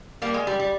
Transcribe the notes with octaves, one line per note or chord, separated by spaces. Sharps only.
G3 A#3
G#3
G3
G3